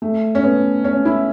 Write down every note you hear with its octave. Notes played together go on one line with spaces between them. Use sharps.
A3
C#4
B3
C#4
E4